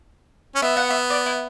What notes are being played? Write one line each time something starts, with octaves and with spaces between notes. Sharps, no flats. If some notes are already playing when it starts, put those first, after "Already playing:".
C#4
B3 E5
F#5
E5
D5
E4